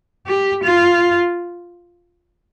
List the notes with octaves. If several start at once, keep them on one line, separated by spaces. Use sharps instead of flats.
G4
F4